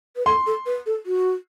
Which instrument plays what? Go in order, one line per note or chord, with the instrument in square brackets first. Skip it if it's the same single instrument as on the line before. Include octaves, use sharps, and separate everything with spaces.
[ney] B4
[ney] A4 [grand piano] C6
[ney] A4
B4
A4
F#4